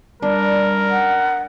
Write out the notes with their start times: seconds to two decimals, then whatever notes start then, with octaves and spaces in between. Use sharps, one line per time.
0.22 G3 D4 A#4
0.91 F#5